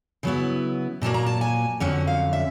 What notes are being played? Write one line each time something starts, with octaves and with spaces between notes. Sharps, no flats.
C#3 F#3 B3 E4
A#2 F#3 A#3 A5
A#5
A5
G#5
F2 D3 F#3 C#4 F#5
F5
E5